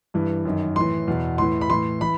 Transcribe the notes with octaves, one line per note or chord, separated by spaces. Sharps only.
G2 E3
F#2 D#3
A2 E3 C6
E2 B2
A2 E3 C6
B5
A2 E3 C6
E3 B5